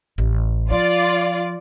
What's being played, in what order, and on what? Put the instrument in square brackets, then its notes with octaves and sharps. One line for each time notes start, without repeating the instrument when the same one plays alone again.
[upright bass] A1
[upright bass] F3 [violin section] F4 D5